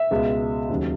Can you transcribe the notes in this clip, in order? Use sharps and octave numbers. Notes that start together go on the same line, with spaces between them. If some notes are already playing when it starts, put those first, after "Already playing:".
Already playing: E5
C#2 B2 G#3
D#2 C#3 F#3